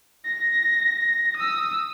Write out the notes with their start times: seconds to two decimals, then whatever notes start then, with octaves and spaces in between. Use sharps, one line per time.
0.25 A#6
1.36 D#6 E6